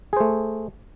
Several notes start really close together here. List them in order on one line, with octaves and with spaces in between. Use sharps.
G#4 C5 A3